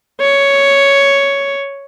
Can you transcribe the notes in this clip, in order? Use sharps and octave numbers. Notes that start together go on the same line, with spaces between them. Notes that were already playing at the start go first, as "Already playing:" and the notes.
C#5